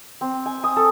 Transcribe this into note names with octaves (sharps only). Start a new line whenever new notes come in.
C4
G#5
D#6
A4